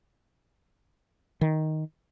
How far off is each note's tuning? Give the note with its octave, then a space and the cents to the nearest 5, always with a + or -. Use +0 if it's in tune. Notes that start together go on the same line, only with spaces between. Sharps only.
D#3 +5